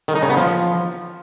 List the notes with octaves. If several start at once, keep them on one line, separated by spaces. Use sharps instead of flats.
D#3
D#4
C#3
B3
F3